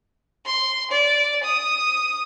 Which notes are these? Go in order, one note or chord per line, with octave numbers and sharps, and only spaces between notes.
C6
D5
D#6